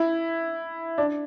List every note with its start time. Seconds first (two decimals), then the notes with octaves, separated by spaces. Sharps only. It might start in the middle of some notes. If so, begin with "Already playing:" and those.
Already playing: E4
0.98 D4